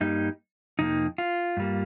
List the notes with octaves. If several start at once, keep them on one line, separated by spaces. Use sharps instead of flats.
G2 G3 A#3 D#4
F2 C3 F3 A#3 D#4
F4
G2 G3 A#3